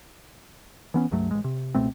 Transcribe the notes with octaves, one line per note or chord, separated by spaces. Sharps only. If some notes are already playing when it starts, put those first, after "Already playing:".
E3 B3 C#4
C#2 G2 F#3 A3
A1 G#3
C3
C#2 B2 A3 C4